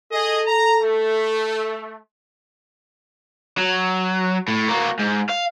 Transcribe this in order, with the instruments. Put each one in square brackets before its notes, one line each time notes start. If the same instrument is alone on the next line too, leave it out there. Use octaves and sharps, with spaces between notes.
[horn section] G#4 D#5 [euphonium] A4
[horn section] A#5
A3
[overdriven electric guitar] F#3
A2
A#3 F#4
G#2
F5